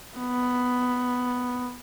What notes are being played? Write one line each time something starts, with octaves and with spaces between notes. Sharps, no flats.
B3